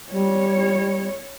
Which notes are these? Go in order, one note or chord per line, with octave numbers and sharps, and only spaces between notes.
G3 C#5